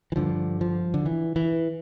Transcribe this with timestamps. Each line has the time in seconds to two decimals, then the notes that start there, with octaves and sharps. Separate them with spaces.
0.12 E3
0.16 G2 D3 F3
0.61 F3
0.94 D3
1.06 E3
1.36 E3